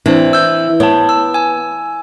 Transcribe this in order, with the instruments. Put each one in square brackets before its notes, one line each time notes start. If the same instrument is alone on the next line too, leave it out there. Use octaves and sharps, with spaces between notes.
[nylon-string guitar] E3 [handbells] C4 D4 C5
[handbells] E6 G6
[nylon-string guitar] B3 [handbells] C#5 A5
[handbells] E6
G#5 E6